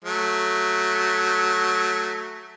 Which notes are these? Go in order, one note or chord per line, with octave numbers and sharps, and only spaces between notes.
F#3 A3